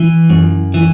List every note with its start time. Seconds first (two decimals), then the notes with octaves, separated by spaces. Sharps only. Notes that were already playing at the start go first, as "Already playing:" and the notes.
Already playing: E3 E4
0.29 F#2
0.74 E3